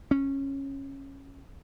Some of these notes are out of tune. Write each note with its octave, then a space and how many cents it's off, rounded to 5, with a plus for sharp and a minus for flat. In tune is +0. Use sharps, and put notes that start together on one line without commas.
C#4 -15